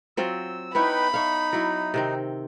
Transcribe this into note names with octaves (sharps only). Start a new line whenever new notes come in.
F#3 C4 F4 E6
B3 D#4 E4 B4 C#5 G5 B5
D#4 C#5 F5
F#3 E4
C3 D#3 C4